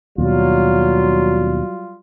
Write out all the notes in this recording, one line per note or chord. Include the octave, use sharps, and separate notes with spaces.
D#2 B2 F#3 G3 F4